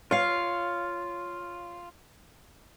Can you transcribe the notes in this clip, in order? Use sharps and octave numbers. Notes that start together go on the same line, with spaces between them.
F4 C#5 F5